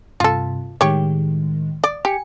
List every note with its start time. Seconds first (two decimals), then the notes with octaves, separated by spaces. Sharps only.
0.20 G2 C3 F4 A4
0.81 A2 D#3 G#3 G4 C#5
1.84 D5
2.05 G4 G#5 C#7